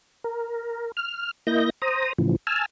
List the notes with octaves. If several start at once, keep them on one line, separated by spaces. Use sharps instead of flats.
A#4
F6
A#3 E4 D#5 G6 A#6
C5 A#5 D#6
A2 C#3 E3 F3
G#5 A5 E6 F6